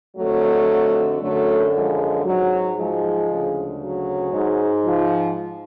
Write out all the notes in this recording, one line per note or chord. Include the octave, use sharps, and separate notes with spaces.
F2 D3 F#3 A3
F#2 D3 F#3 A3
F3 G#3
G#2 F#3
F3 G#3
D2 C#3
F#3
G#2
F3